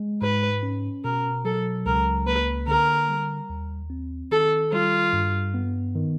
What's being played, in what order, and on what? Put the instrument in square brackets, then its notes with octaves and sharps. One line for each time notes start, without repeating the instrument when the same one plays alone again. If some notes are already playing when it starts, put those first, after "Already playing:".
Already playing: [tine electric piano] G#3
[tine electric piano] G#2 [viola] B4
[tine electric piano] C#4
[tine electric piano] B2 [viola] A#4
[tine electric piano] F#3 [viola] A4
[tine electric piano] C#2 [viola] A#4
[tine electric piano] A#3 [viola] B4
[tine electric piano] D3 [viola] A#4
[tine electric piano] G3
D#2
C4
[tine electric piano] D#3 [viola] A4
[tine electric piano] G3 [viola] F4
[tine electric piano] G2
B3
D#3